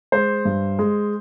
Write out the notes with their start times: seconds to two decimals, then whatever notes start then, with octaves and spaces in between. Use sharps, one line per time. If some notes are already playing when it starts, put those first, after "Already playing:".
0.12 G#3 C5
0.45 G2
0.79 G#3